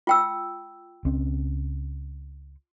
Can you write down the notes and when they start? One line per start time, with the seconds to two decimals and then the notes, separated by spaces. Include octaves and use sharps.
0.07 F4 G5 E6
1.05 C#2 C4 C#4